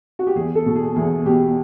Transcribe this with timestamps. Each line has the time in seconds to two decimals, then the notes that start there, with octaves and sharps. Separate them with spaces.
0.19 F#4
0.27 G4
0.36 E2 G#4
0.55 A4
0.66 B2
0.76 G#4
0.96 E2 G#4
1.26 B2 G4